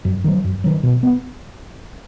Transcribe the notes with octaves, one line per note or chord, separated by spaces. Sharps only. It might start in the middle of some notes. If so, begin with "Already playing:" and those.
F#2
D#3 F#3
F#2
D#3 F#3
B2
B3